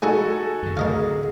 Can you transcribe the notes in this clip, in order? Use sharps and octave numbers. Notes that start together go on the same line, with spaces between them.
A3 D#4 F#4 G#4 A4 G#5
F#2 D#3
D2 A2 C3 G#4 A#4 D#5 F5